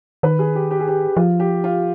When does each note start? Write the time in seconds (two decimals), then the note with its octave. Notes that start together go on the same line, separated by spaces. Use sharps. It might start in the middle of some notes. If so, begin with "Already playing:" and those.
0.23 D#3 B4
0.39 G#4
0.55 G4
0.71 G4
0.80 G#4
0.88 G4
1.16 F3 F4
1.40 G4
1.64 F4